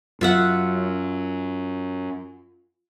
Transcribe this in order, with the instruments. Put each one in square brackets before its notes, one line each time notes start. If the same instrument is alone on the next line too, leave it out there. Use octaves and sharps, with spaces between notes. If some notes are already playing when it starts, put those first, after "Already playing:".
[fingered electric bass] F#2 [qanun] F4 E5 F#5